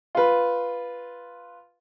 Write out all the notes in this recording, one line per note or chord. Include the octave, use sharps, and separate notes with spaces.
F4 B4